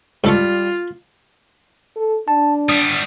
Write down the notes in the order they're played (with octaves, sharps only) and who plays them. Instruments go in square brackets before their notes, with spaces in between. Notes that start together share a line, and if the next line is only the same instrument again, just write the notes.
[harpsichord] G#2 A4 C#6 [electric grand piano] G3 [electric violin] F4
[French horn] A4
[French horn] D4 [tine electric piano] A5
[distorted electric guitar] G3 B3 [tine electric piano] D#6